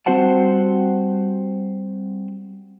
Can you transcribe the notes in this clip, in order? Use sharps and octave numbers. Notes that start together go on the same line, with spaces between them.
G3 C4 F#4 C5 F#5 A5